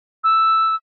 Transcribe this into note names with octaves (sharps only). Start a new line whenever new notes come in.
E6